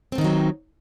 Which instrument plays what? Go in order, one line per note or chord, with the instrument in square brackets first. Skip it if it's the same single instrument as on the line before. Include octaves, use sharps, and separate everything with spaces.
[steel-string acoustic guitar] C4
A3
D#3
D#4
F#3